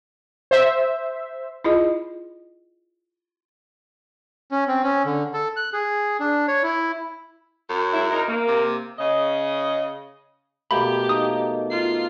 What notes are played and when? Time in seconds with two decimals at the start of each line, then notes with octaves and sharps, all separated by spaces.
0.51 C5 E5
1.64 E4 F4 G#4 D#5
4.52 C#4
4.68 C4
4.83 C#4
5.06 D3
5.34 A4
5.57 F#6
5.73 G#4
6.20 D4
6.48 C#5
6.63 E4
7.70 F#2
7.94 G#3 C#4 E4
8.11 D#4 A#4
8.29 A#3
8.48 C3
8.99 C#3 D#5
10.71 B2 A3 A#3 G4 B5
11.09 D#4 D#6
11.70 F4 C7